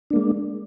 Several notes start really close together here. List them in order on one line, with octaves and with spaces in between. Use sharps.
D4 A#3 G#3